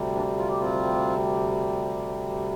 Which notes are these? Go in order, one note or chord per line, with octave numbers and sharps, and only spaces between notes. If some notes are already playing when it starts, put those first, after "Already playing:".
Already playing: D2 C3 G3
A#3 D4
F4
G4
C4 F4